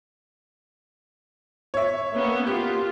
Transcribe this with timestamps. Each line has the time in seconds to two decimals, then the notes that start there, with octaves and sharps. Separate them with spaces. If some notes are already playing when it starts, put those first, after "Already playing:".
1.74 C#5 E5
2.15 A#3 B3 C#4
2.47 F4 G4